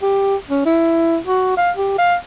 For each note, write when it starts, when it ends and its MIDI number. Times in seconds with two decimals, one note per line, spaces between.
0.02 0.36 67
0.50 0.61 61
0.66 1.18 64
1.27 1.53 66
1.57 1.71 77
1.77 1.95 67
1.98 2.16 77